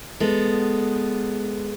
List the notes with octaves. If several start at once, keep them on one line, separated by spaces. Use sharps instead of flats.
G#3 B3 A4